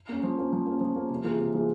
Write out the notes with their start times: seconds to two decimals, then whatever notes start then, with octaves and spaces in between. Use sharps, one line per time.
0.09 A#3 C#4
0.23 F3
0.38 A#3 C#4
0.53 F3
0.66 A#3
0.71 C#4
0.81 F3
0.96 A#3 C#4
1.10 C3
1.24 E3 A#3 F4 G#4
1.39 C3
1.54 E3 A#3 F4 G#4